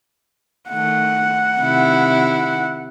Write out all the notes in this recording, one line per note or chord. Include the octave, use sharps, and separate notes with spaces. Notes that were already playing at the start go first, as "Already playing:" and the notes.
D#3 A3 F#5
C3 D#3 E4